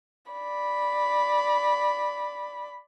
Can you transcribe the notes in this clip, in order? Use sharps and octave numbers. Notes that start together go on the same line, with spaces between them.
D5 B5